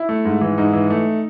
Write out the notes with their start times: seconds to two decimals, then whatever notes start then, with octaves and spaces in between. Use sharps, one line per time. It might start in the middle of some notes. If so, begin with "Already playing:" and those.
Already playing: E4
0.09 A3
0.25 G#2
0.41 E3
0.58 G#2 D#4
0.74 E3
0.90 A3